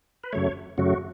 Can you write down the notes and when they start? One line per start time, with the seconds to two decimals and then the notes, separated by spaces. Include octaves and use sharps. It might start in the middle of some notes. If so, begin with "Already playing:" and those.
0.24 B4
0.33 F#2 C#3 F#3 A3 C#5
0.78 F#2 C#3 F#3 A3 F#4